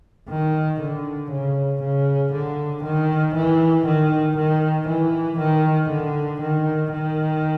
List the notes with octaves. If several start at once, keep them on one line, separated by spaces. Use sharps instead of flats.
D#3
D3
C#3
C#3
D3
D#3
E3
D#3
D#3
E3
D#3
D3
D#3
D#3